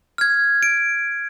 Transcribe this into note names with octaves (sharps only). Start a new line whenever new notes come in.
F6 G#6
D7